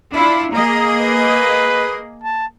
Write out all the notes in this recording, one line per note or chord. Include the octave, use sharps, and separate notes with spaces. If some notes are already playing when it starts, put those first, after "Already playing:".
D4 E4 F4 B5
A#3 G#4 D#5 A#5
B4
A5